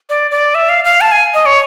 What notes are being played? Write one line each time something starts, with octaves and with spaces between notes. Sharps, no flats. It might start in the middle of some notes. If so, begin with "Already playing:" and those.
D5
D5
E5
F5
F5
A5
G#5
D#5
C#5